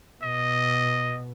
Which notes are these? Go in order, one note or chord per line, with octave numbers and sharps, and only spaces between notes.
B2 D#5